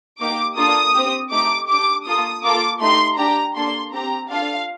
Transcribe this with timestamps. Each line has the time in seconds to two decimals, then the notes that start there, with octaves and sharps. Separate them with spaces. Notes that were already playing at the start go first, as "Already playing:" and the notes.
0.19 A#3 D#4 G4 D6
0.56 A#3 D4 F4 A4 D#6
0.94 C4 G4
1.31 A3 D#4 G4 D6
1.68 D4 G4 D6
2.05 A#3 F4 A4 D#6
2.43 A#3 F4 A4 D6
2.80 A3 D#4 G4 C6
3.18 D4 G4 A#5
3.55 A#3 D4 A4 C6
3.92 C4 G4 A#5
4.29 D4 F4 A4 F5